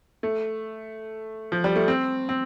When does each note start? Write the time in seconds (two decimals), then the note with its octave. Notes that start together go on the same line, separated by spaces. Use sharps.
0.23 A3
1.52 F3
1.64 G3
1.76 A3
1.88 C4
2.29 C4